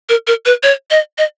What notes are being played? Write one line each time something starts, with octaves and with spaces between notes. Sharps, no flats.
A#4
A#4
B4
C#5
D#5
D#5